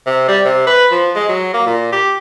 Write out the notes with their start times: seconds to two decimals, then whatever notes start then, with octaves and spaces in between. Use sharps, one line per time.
0.06 C3
0.28 G3
0.45 C3
0.67 B4
0.92 F3
1.16 G#3
1.29 F#3
1.54 A#3
1.66 A#2
1.92 G4